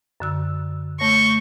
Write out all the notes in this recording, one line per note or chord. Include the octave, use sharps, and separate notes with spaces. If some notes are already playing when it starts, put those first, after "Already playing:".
F#2 D3 E6
A3 C#5 C#6 G6 A#6